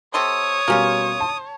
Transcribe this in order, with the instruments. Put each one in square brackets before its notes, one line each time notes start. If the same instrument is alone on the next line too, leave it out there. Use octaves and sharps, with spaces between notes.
[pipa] C3 A4 C6 [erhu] C#5 [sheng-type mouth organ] D#6
[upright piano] B2 G3 B3 [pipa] A#3 C#4 F4
[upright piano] A5